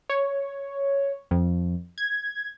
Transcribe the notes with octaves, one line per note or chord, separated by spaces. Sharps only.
C#5
F2
G#6